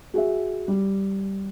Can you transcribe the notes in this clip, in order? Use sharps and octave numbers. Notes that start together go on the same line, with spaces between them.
F#4 G#4 E5
G3